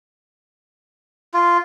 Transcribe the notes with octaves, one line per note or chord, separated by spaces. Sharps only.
F4